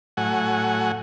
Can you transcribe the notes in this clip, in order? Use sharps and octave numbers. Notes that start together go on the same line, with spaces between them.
A2 F#3 F#5 G#5